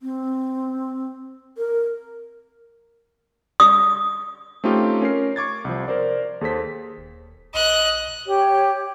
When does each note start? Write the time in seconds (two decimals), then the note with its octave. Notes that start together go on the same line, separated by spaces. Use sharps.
0.01 C4
1.58 A#4
3.60 D#6
4.64 A3 C4 C#4 D#4 F4 G4
5.02 C#4 A#4 C7
5.36 C#6 D6 G#6 A6
5.65 C2 F3
5.88 A#4 C5 D5
6.41 D#2 G#4 A4 C5 B6
6.97 D#1
7.54 A#1 D#5 F#6
8.26 G4 C#5